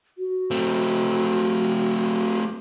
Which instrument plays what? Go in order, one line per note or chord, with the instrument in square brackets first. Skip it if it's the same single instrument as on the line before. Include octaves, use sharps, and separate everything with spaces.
[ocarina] F#4
[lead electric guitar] A3 C4